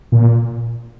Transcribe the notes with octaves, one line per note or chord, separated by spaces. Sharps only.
A#2